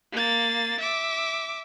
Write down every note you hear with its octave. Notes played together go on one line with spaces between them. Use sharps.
A#3 A6
E5 D6